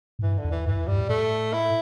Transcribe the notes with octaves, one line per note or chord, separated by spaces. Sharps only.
A2
G2 E3
D3
E2
E3
G2 E3
E2
G2 G3
A2
A2 A3
E4